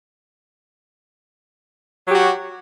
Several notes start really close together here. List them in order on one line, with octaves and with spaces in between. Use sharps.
F#3 G4 F#4